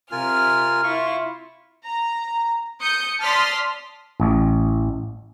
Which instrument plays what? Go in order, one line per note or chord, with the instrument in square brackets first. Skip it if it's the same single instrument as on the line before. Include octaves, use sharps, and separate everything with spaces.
[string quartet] C3 F6 [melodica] F4 A#4 G#5
[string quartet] E4 F4 [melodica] C#6
[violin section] A#5
D#6 G6 C#7
D5 A5 C6 D#6 F6 B6
[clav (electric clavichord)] A1